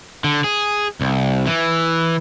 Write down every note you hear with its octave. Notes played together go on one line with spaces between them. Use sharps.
D3
G#4
C2
E3